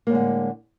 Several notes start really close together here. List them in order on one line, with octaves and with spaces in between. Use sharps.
A#3 A2 G#3 D3